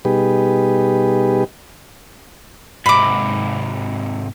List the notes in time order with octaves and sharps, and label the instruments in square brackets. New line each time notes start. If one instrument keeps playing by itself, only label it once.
[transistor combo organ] B2 G3 D#4 G4 G#4 B4
[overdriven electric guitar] G#2 C3 [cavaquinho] B5 D6